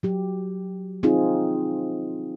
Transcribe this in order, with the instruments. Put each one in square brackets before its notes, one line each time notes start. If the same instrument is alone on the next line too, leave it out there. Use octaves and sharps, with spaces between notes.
[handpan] F#3 G4
C4 D#4 F4 G#4